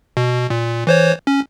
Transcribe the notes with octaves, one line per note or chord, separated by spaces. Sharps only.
B2
A#2
E3 C5 C#5
C#4